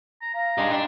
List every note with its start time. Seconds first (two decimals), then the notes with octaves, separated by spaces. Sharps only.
0.21 A#5
0.34 F5 A#5
0.58 G#3 D4 D#4 G4
0.71 G3 G#3 D4